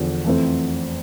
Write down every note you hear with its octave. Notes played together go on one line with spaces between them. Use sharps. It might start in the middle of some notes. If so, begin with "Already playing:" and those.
Already playing: E2 D3 F3
F2 E3 A3 C4